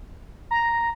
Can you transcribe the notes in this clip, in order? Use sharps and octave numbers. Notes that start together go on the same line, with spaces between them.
A#5